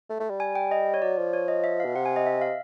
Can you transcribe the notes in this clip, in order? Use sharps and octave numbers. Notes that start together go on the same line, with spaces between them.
A3
A3
G3
G#5
G5
D#5
C#5
F#3 D5
F3
C#5
D#5
E5
F5
B2
C3 F#5
G#5
D#5
E5
F5